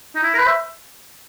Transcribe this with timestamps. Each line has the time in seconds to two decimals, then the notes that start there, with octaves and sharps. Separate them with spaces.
0.16 D#4
0.23 E4
0.34 A#4
0.39 B4
0.47 E5